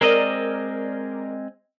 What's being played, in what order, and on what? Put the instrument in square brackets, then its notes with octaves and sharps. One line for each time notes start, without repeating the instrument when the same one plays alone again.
[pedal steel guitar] G#3 C4 D#5 [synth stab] A#4 D5